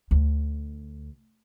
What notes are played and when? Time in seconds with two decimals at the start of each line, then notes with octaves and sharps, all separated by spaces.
0.11 D2